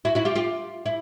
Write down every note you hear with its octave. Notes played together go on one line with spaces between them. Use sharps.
E4 F#4
E4 F#4
F4 G4
F4 G4
E4